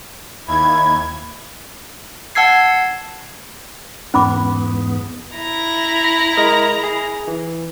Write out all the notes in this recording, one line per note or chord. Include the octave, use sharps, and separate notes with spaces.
D#2 E4 G#6
F#5 A5 E6 G#6 C7
E2 G#2 B3 C#4 B5 D6
E4 A#5
B5
G#3 A#4 D#5
G#4
E3